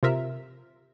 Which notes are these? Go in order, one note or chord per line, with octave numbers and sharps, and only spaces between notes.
C3 F4 A#4 E5